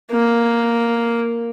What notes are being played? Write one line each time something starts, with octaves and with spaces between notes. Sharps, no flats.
A#3